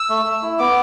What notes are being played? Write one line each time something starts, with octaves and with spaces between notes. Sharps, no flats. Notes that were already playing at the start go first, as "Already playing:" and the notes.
Already playing: E6
A3
A3
E4
B3 D6